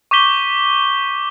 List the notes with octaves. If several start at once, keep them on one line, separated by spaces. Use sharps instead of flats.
C#6 D6 G6 B6 G7